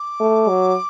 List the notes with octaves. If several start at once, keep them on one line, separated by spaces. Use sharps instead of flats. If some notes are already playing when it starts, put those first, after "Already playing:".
Already playing: D6
A3
F#3